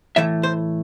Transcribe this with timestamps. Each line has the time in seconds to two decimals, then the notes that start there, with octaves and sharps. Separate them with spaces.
0.16 A2 E3 A3 E5
0.43 C5